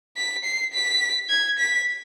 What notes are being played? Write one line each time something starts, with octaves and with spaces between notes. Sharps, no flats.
B6
C7
B6
G#6
B6